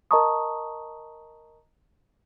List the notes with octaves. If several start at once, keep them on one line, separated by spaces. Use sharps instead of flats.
A#4 D#5 A5 A#5 C#6 D#6